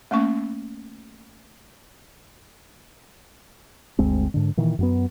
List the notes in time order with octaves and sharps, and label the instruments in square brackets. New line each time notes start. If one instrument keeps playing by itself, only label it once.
[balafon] A3 A#3 C#4 C#6
[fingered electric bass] G1 D2 G#3 C4
G#2 D3
A#2 D#3 E3
F#2 F#3 B3